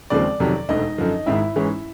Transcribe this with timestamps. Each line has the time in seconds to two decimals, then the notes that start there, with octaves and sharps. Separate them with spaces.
0.10 D#2 C#3 F3 G#3 C4 D5
0.40 F2 C3 D#3 F#3
0.69 E1 D2 D3 D#4 D#5
0.98 F#2 D3 F3
1.26 G#1 G#2 D#3 E4 E5
1.56 G#2 E3 G#3 C#4